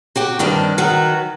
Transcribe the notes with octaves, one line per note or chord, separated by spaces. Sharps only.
F#4 G4 G5
G2 D#3 C4 D4
D#3 F#3 F#4 B4